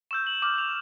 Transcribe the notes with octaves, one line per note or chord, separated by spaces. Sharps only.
C#6 E6 G6 E7
F#7
D6 F6 E7
F7